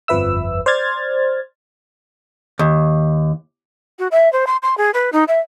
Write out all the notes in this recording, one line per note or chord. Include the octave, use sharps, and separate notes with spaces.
G1 F2 F3 B4 E5 E6
C5 D5 F6 G#6 A6
D#2
F#4
E5
C5
C6
C6
G#4
B4
D#4
E5